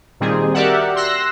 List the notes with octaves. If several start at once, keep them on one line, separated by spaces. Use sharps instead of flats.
A#2 D#3 G3 C4 G#4
F#4 G4 A#4 D5 E5 F#5
C6 E6 F#6 A#6